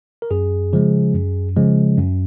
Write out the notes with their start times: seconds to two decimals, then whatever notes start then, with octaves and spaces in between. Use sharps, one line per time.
0.22 A#4
0.31 F#2 G#4
0.73 C#3 F3 G#3
1.14 F#2
1.56 C#3 F3 G#3
1.97 F#2